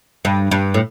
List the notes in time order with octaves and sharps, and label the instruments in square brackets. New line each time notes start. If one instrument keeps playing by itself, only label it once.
[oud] G2
G2
A2